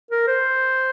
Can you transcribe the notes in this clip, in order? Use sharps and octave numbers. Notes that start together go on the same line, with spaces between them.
A#4
C5